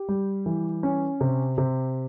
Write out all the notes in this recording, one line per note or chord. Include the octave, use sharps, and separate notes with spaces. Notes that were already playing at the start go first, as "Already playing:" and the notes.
Already playing: G4
G3
E3
C#4
C3
C3